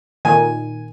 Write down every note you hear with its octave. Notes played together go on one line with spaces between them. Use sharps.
A#2 D#3 G#5